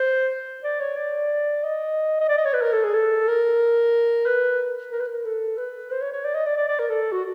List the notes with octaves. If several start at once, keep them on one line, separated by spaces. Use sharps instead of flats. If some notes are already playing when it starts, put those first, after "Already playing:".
Already playing: C5
D5
C#5
D5
D#5
D#5
D5
D#5
C#5
B4
A#4
A4
G#4
A4
A#4
B4
A#4
B4
A#4
A4
B4
C5
C#5
C#5
D5
D#5
D5
D5
D5
A#4
A4
F#4